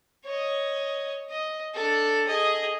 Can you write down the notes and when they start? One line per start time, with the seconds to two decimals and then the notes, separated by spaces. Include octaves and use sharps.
0.25 C#5 D#5
1.30 D#5
1.74 D4 A4
2.27 G#4 D#5